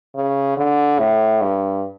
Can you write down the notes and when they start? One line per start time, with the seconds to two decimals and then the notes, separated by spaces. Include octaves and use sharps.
0.16 C#3
0.57 D3
0.99 A2
1.41 G2